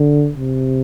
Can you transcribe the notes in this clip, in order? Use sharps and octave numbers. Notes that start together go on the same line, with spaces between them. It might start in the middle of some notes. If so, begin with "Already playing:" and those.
Already playing: D3
C3